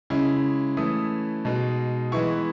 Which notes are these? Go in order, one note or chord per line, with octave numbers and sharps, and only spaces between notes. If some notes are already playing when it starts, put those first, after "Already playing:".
C#3 G#3 C#4 E4
E3 A3 C#4 E4 D#6
B2 G#3 D#4
E3 G#3 B3 E4 C#6